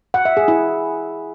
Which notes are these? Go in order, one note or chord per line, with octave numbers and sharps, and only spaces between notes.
F#5
E5
G#4
E4